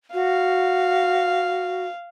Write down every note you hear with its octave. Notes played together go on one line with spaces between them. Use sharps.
F#4 F5